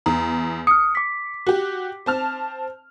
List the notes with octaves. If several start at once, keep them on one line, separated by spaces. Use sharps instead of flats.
E2 A#5
D#6 F6 C#7
D6 B6
F#4 G4
C4 A5 F6